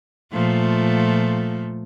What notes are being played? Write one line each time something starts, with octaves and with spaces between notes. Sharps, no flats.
A#2 F3 A3